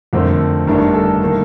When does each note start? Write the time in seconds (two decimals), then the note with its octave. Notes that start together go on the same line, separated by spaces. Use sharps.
0.13 F2 D3 A3 C4 A#4
0.67 G1 G2 D#3 A3 D4 A#4
0.94 A4
1.22 D#3 A#3